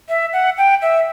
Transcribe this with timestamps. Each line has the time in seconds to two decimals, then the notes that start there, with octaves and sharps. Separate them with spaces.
0.09 E5
0.33 F#5
0.58 G5
0.82 E5